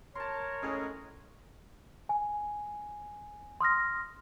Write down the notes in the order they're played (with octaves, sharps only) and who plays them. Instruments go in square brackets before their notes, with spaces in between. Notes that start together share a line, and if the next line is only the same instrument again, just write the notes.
[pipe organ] A#4 [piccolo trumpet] C#5 [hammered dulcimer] A5 C6
[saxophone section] A2 G#3 C#4 [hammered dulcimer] G#4
[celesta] G#5
C6 D#6 F6 A#6